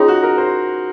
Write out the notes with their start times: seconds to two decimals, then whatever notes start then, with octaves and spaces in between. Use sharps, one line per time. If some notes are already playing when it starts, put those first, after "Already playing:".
Already playing: C#4 D#4 F4 G#4 C#5
0.08 F#4
0.23 A#4
0.38 C5